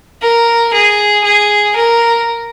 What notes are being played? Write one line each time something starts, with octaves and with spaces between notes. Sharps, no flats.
A#4
G#4
G#4
A#4